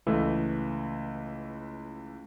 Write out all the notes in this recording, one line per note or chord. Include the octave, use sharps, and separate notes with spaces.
C#2 E3 A3